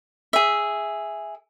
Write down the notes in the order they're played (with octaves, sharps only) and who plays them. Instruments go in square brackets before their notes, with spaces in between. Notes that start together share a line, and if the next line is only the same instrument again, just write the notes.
[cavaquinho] G#4 E5